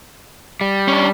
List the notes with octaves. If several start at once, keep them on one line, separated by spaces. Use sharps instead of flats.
G3
C#4 D4